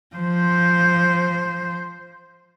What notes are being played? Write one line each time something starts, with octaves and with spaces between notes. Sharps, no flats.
F3 C5